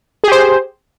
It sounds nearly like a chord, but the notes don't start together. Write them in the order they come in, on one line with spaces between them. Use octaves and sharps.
G#4 G4 C5